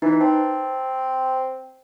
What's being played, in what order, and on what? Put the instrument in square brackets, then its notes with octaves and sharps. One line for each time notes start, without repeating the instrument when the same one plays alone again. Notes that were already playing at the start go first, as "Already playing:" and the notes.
[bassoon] E3 [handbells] D#4 B4
[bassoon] C4 [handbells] A5